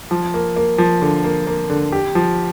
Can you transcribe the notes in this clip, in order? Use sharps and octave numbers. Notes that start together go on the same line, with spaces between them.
F3
A#3
A#3
F3
D3
A#3
A#3
D3
G4
F3